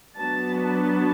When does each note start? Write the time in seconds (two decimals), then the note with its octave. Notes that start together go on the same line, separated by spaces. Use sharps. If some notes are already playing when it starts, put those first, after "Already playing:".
0.17 F#3 B3 D4 A5
0.64 A5